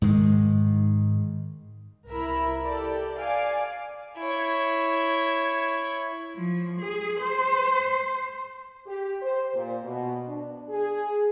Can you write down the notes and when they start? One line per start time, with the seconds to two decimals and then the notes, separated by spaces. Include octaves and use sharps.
0.02 G#2 D#3 G#3
2.09 C2 E4 A#4 E5 B5
2.63 G4 A4 D5
3.20 D5 F5 G#5 D6
4.18 E4 C#5
6.36 F3
6.80 G#4
7.20 C5
8.86 G4
9.22 C5
9.54 A#2
9.84 B2
10.28 D4
10.69 G#4